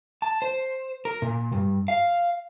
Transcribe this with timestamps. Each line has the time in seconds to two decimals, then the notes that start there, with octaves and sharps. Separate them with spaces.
0.22 A5
0.42 C5
1.05 A#4
1.22 A#2
1.53 G2
1.88 F5